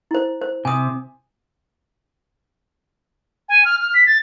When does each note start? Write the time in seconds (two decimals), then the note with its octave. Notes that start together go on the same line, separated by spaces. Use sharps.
0.11 E4 C5
0.41 C5
0.65 C3 G#5 D#6
3.48 G#5
3.65 F6
3.80 F6
3.94 B6
4.06 A6